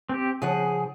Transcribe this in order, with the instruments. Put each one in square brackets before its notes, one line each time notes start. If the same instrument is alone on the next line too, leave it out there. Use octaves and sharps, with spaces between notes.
[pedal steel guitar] C4 G4
[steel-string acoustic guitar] C#3 F3 F#5 [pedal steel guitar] G#4